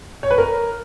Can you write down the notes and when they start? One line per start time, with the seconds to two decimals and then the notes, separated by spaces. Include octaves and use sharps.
0.23 C#5
0.31 B4
0.38 A#4